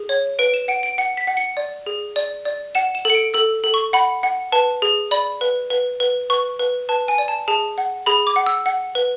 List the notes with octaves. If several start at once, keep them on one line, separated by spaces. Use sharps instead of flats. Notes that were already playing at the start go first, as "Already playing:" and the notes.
Already playing: G#4
C#5
B4 D7
E7
F#5 D7
D7
F#5 C#7
B6
F#5
C#7
D5
G#4
D5
D5
F#5 E7
E7
A4 C#7
D7
A4 E6
A4
C#6
F#5 B5
F#5
B4 A5
G#4
D5 B5
B4
B4
B4
B4 C#6
B4
B4 A5
G#5
D5
A5
G#4 A5
F#5
G#4 B5
D6
F#5
E6
F#5
B4